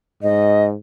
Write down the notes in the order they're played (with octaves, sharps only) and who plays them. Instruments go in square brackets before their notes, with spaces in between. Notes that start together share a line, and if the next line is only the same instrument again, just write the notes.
[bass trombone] G#2 [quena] D#5